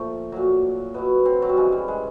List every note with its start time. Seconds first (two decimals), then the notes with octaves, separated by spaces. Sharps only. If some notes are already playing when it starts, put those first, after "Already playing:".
Already playing: A#2 F3 A3
0.32 A#2 F#3
0.94 B2 F#3 B3
1.25 C4
1.42 F#3
1.49 G3
1.57 C#3 E3 G#3
1.72 G3
1.88 G#3